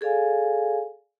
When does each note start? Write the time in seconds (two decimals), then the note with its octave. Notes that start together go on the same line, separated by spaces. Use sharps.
0.01 G#4 A4 D5 F5 G#5